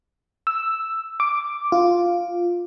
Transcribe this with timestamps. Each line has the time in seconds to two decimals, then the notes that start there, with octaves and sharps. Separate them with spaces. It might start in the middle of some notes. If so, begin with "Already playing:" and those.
0.47 E6
1.20 D6
1.72 F4